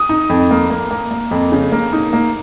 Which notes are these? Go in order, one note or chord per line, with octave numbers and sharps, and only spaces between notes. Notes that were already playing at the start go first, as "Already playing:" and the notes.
Already playing: D#6
D#4
F2
A#3
A#3
A#3
A#3
F2
C#3
A#3
D#4
A#3